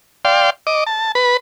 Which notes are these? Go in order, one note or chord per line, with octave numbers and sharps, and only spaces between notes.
D5 F5 G5 C6
D#5 D6
A5
B4 B5